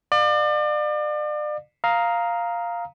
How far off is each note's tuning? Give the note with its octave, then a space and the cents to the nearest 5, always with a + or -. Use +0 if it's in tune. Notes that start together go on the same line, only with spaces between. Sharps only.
D5 +35 F5 +30
F5 +0 A#5 +0 D#6 +25